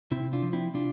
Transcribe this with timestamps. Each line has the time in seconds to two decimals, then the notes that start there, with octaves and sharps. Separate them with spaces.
0.11 C3 C4 E4
0.33 D4 F4
0.43 F3
0.53 C4 E4
0.74 C3 D4 F4